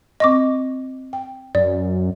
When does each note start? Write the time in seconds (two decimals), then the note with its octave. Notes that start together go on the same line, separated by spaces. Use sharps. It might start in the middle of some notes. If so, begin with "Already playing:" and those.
0.20 C4 D#5 C#6 D6 A#6
1.13 G5
1.55 F#2 D5